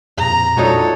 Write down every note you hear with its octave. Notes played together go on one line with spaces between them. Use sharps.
F2 A#2 A#5
A#2 F#3 D4 D#4 F4 A4 C#5